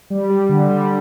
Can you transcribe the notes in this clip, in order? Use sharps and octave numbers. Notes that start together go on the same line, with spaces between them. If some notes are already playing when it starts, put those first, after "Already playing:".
G3
G3
D3
G3